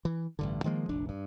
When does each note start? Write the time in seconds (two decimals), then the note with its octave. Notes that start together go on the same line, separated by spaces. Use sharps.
0.05 E3
0.39 A1 G2 D3
0.64 D#3 F3 G#3 A#3
0.89 F1 A#1 D4
1.09 G2